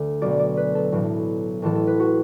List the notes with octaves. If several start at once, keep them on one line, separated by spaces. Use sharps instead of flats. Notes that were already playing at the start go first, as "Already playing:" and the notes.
Already playing: D2 D3
B1 B2 D5
D5
B4
A4
B1 A2 E3
A1 A2 E3 A4
A4
B4
F#4